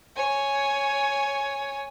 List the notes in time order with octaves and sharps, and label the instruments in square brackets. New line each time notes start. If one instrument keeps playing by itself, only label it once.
[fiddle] C#5 G#5